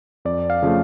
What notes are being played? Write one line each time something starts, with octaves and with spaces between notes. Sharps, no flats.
F2 D5
F5
C#3 F3 A3